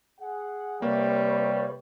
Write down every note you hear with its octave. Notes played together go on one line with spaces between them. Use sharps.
G#4 F#5
C3 G3 A#3 B4 C#5